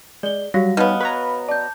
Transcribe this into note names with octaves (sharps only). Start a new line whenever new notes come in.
G#3 D5 G7
F#3 G3 F#4 F5 A#6
B2 B3 C#4 D#4 F5 F6
B4 C#5 A#5 B5
D5 A5 G6